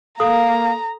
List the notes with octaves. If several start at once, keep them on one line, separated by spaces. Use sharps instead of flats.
A#3 A4 F5 A#5 D#6